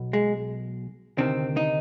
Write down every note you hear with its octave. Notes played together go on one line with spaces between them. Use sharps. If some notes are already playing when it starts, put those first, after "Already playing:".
Already playing: B1 B2
G#3
D2 C3 D#3 C4
D#4